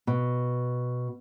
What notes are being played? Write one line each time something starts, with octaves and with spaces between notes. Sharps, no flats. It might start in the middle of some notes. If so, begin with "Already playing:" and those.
B2